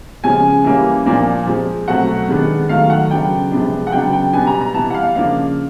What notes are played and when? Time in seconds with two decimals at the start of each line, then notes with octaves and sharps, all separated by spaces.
0.24 C#3 F3 G#3 C#4 G#5
0.64 E3 G3 A#3 C#4
1.06 A#2 F3 A#3 D4
1.47 F3 G#3 C4
1.88 B2 F#3 A3 C4 F#5
2.28 D#3 G#3 B3 D4
2.69 D#3 F#3 A3 F5
2.90 F#5
3.10 C#3 F#3 B3 D4 G5
3.51 C3 F3 G#3 B3 D4
3.87 F#5
3.92 C#3 F#3 B3 D4 G5
4.13 G5
4.33 B2 G3 B3 D4 G#5
4.47 A#5
4.61 A#5
4.74 E3 G3 B3 A5
4.90 F#5
4.95 F5
5.15 C#3 F3 A#3 D4 F5